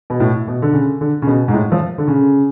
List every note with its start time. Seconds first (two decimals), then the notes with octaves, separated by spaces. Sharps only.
0.10 B2
0.20 A2
0.48 B2
0.62 D3
0.73 C#3
1.01 D3
1.22 C#3
1.27 B2
1.48 G#2
1.53 A2
1.72 F3
1.98 D3
2.07 C#3